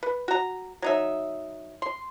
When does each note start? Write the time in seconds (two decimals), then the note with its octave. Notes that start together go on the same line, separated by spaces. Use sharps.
0.03 B4
0.28 F#4 A#5
0.82 F#3 D#4 E5
1.82 C6